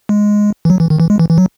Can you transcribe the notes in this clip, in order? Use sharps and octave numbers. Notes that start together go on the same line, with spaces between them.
G#3
E3
F#3
E3
D#3
E3
G#3
E3
E3
F#3